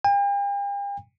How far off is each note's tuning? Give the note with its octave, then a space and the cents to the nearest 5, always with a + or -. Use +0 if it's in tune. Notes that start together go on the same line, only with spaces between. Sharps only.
G5 +45